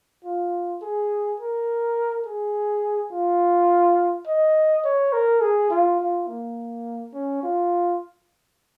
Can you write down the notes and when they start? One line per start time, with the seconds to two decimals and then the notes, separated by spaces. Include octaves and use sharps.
0.25 F4
0.82 G#4
1.40 A#4
2.26 G#4
3.12 F4
4.27 D#5
4.84 C#5
5.13 A#4
5.41 G#4
5.70 F4
6.00 F4
6.28 A#3
7.14 C#4
7.43 F4